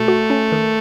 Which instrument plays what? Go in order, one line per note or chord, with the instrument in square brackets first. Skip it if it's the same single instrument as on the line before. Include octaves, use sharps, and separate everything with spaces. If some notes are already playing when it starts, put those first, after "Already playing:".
Already playing: [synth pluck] B2 [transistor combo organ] A3
[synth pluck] F#4
C#4
D#3